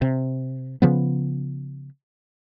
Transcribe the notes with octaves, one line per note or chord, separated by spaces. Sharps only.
C3
C#3 F3 B3